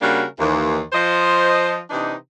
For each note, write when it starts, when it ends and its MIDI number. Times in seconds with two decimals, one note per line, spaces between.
0.02 0.24 49
0.02 0.24 55
0.02 0.24 58
0.02 0.24 62
0.02 0.24 66
0.02 0.24 70
0.39 0.80 39
0.39 0.80 52
0.93 1.79 53
0.93 1.79 72
0.93 1.79 75
1.90 2.14 48
1.90 2.14 52
1.90 2.14 62
1.90 2.14 63